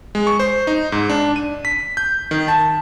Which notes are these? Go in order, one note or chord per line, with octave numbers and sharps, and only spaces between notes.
G#3
C#6
C5
D#4
G#2
D4
D#7
B6
G6
D#3
A5